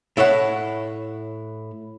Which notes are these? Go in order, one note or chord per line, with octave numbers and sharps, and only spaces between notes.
A2 E4 A4 C#5 F#5